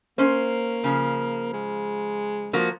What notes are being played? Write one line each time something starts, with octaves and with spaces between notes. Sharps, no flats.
A#3 C#4 C5
C#3 F3
G#3
F3 A#3 F#4